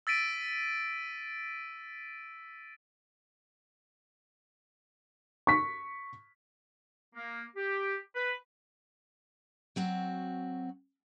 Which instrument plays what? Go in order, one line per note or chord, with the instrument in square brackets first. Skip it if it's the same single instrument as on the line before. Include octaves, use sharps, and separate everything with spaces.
[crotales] E6 A6 B6 D7 D#7
[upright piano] C#6 B6
[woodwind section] A#3
G4
B4
[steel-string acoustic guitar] F#3 C4 F#4